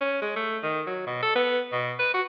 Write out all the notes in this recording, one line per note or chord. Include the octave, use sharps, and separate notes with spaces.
C#4
G#3
A3
D#3
F#3
B2
A4
B3
B2
B4
F#4